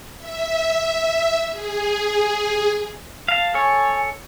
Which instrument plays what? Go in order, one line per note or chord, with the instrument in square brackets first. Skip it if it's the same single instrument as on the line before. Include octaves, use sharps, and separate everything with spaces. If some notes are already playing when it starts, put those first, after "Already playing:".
[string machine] E5
G#4
[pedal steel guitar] F5 A5
[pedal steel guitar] A4 C#5 [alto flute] G#5